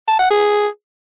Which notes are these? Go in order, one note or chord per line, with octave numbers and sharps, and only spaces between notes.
A5
F#5
G#4